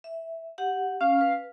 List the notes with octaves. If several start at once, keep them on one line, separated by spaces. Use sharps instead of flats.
E5
G4 F#5
C#4 F5
B4